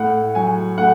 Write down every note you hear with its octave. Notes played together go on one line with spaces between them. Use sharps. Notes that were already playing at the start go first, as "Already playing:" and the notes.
Already playing: A2 F#5
F#3 G#5
A2 F#5